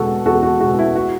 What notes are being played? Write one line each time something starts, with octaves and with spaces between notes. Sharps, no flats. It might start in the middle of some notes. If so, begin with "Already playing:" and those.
Already playing: E2 B2 G#3 F#4 A4
E2 F#4 A4
F#4
B2 G#3 F#4
E4
F#4